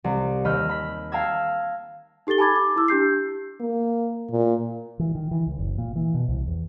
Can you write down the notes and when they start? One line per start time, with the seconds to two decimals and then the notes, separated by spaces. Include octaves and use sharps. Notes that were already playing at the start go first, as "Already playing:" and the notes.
0.04 C2
0.44 D#2 D#5 B5 E6 F6 G6
0.69 B5 B6
1.12 F5 G5 A5 A#5 E6 G#6
2.27 D#4 G4 A4 A6 G7
2.38 G#5 A5 B5 D6 G#6 A6
2.56 D6
2.76 E4 A5 D6 E6
2.88 D4 G4 G6 C7
3.60 A#3
4.31 A#2
4.99 E3
5.15 D#3
5.31 E3
5.47 C#2
5.59 F#1
5.78 A#2
5.96 E3
6.14 B2
6.28 C2
6.47 E2